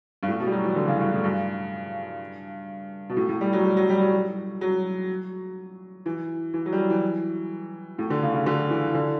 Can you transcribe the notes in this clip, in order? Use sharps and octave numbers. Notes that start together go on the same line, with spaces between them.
G2
A2
B2
G3
F#3
E3
D3
C#3
G2
A2
G2
B2
A2
A2
G3
F#3
G3
F#3
G3
F#3
F#3
E3
E3
F#3
G3
F#3
E3
A2
D3
C#3
C#3
D3
E3
D3